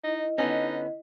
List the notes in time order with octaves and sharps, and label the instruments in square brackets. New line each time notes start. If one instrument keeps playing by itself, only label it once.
[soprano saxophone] D#4 [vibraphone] E4 D#5
[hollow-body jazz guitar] D3 B3 C#4 [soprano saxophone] D#4